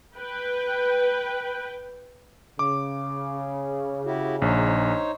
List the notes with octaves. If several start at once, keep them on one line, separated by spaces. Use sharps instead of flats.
B4 G5
C#3 D6
E4 F#4 G4
A#1 D#4 C5 C#5